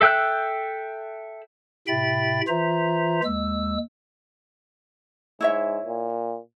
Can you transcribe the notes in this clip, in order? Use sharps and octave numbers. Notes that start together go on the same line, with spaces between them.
A4 E5 G5 E6 F#6
A2 C3 E5 G5 B5 A6
E3 F4 C5 E5 A#5
D#2 G#3 E6
G#2 E4 C#5 E5
A#2